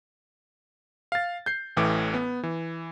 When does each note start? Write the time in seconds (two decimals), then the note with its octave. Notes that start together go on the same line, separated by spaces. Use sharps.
1.12 F5 A6
1.46 G6 C7
1.77 A1 A2 E3 D6
2.14 B3
2.43 E3